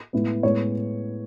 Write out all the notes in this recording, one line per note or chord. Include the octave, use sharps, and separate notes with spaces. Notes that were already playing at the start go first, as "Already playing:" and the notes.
A2 G#3 B3
A2 G#3 B3 C#5